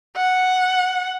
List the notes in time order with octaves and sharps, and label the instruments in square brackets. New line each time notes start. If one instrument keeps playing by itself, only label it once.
[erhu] F#5